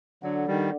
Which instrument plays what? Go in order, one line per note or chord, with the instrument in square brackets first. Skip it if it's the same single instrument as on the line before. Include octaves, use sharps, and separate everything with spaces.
[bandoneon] D3 F#3 [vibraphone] D4 A4 D5 F#5
[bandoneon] D#3 G3